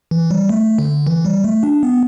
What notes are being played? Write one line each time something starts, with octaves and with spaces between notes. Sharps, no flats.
E3
G3
A3
D3
E3
G3
A3
D4
B3